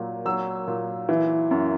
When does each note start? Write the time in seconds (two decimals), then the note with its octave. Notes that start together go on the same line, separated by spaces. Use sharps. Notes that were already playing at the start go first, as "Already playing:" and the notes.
Already playing: A#2 F#3
0.25 F#3 E6
0.67 A#2
1.09 E3
1.51 F#2